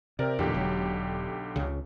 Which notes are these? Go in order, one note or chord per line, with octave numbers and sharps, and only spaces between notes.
C3 G4 A#4 D5
B1 E2 A#2 D3 G4
E1 F#3
C#2 C#3